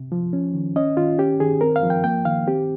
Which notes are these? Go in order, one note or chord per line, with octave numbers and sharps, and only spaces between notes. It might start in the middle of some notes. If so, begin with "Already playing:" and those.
Already playing: C3
F3
C#4
D#3
C#4 D#5
D#3 F4
C#4 G4
D#3 G#4
C4 A#4
F5
F3
G5
A#3 G5
D#3 F5
C4 G4